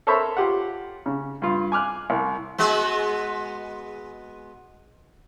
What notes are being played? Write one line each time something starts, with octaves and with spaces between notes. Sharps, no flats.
A4 A#4 C5 C#5 E5 B5
F4 G4 F#5
C#3
G2 F4
G#5 D6 F6 F#6
C2
G#3 B3 F#4